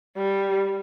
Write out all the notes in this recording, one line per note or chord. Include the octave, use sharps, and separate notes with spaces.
G3